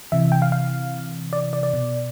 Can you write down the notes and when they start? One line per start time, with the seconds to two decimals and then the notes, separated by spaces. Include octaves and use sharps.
0.12 C3 E3 E5
0.32 G5
0.42 F5
0.52 F5
1.33 D5
1.53 D5
1.63 D5
1.74 B2